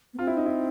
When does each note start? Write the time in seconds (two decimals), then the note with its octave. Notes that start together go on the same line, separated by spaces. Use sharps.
0.14 B3
0.19 C4 F4
0.27 E4
0.37 D#4
0.46 E4